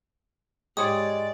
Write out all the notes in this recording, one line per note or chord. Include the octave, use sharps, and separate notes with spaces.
G#2 G#3 G4 C#5 D5 D#6